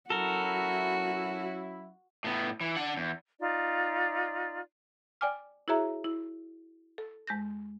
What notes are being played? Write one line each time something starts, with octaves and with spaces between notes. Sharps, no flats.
F#3 C#4 E4 F#4 A4 A#4
A2 B3
E3
D4 F#5
E2
D#4 F4 D5
D5 G5 G#5 D6 F6
E4 F#4 G#4 C#5 E5 A#5
E4
A4
F2 G#3 G6 A#6